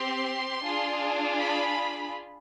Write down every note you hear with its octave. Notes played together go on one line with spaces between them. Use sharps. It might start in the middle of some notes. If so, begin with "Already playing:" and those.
Already playing: C4 G4 C6
D4 F4 G#4
B5